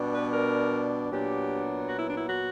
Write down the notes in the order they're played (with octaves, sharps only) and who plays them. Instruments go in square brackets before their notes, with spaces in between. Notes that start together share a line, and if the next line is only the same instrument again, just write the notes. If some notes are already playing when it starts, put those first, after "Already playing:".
Already playing: [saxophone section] B2 G3 B3 D4
B4
A#4
A#2 F#3 B3 D4 G4
F#4
E4
D4
E4
F#4